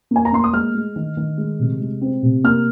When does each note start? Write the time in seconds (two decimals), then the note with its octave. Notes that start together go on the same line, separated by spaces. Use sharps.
0.11 A#3 G#5
0.25 A#5
0.32 A#3 C6
0.44 D#6
0.53 G#3 F6
0.74 G#3
0.96 D#3
1.17 D#3
1.38 G#3
1.59 C3
1.80 G#3
2.01 C4
2.23 C3
2.44 A#3 F6